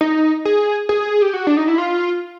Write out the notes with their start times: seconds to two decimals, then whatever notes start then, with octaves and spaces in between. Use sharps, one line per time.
0.01 D#4
0.45 G#4
0.89 G#4
1.22 G4
1.34 F#4
1.47 D4
1.57 D#4
1.68 E4
1.78 F4